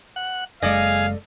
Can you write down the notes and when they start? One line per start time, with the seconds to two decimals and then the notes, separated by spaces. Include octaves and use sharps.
0.16 F#5
0.62 F#1 G#3 G#4 A4 D5 D#5 F5